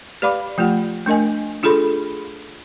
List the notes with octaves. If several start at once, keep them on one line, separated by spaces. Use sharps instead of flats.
G4 B4 D5 F5 B5 D6
F3 A3 F4 G4 F#5
A3 D4 A#4 D#5 G#5
D4 F4 G#4 A4 B5 C6